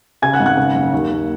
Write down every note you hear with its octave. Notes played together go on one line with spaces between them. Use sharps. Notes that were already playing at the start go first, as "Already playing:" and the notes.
C#3 G#5 G#6
F#5 F#6
G#1
F#5 F#6
C#3
F#1
D#2
D#2